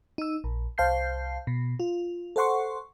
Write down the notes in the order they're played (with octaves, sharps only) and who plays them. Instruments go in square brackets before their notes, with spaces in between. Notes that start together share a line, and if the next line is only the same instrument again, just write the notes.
[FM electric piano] D#4 E6
A#1
C2 C5 F5 A5 G6 C7
B2
F4
A4 C5 F#5 C6 C#6